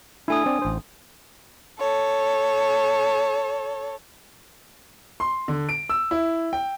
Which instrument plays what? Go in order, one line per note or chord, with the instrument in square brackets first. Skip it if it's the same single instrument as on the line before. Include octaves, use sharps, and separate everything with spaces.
[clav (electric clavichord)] A3 E4 [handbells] D4 G#5 D#6
[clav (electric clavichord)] C4 D5
A1 C5
[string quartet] A4 C#5
[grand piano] C6
D3
D7
E6
E4
G5